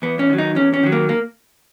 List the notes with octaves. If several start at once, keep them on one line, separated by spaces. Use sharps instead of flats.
E2 B3
C#4
D#3 F#3
D#4
E2 C#4
C#4
D#3 F#3
A#3
A#3